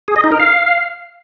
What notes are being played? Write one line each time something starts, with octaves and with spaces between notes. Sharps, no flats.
G#4
D#5
D#4
A#4
F5